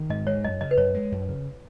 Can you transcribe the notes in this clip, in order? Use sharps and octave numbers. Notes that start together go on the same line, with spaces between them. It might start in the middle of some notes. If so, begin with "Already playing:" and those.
Already playing: D#3
G#2 D#5
G#3 C#5
F#2 D#5
C#3 D#5
B4
F#2 C#5
G#3
F#2
C#3